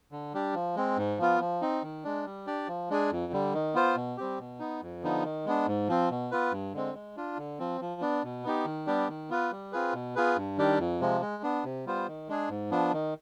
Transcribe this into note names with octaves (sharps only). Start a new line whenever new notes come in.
D3
G3 D4 G4
F3
G#3 C4
G#2
F3 B3 F4
F3
C4 D#4
D#3
G#3 D4
G3
D4 G4 D5
F3
G#3 D4 G#4
F2
D3 G3
D#3
B3 F4 C5
B2
G3 C4 G4
B2
B3 D#4
F2
D3 F3 B3 D#4
D#3
G#3 B3 D4
G#2
F3 C4
B2
B3 F4 B4
G2
D3 G#3 C4
G#3
D4 F4
D3
F3 C4
F3
B3 D4
B2
B3 D#4 G4
D#3
G3 B3 D4 G4
D#3
B3 F4 B4
G3
C4 F4 G#4 B4
B2
B3 F4 G#4 B4
G2
D#3 G3 D4 G4
F2
C3 F3 G#3
G#3
B3 D4
C3
G3 B3 F4 C5
D#3
G#3 D4 G#4
G#2
F3 B3 D4
D#3